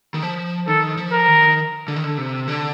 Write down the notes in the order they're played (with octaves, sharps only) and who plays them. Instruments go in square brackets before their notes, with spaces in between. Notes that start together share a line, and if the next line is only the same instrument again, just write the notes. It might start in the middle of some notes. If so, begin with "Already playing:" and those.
[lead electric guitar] D#3
F3
[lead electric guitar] D#3 [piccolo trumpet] A4
[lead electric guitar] F3
[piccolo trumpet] A#4
[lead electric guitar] D#3
D3
D#3
D3
C3
D3